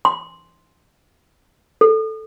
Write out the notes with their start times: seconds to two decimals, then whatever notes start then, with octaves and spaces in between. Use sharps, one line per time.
0.05 C6
1.81 A4